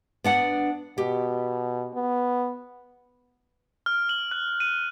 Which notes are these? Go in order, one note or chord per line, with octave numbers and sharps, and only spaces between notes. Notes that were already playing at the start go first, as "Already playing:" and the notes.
B3 D4 F#5
B2 G4
B3
F6
F#7
F#6
D#7